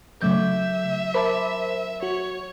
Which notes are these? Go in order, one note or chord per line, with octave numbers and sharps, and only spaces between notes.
C#3 F#3 A3 E5 D6 G6
A#4 C5 A5 B5 D6 B6
F#4 C#5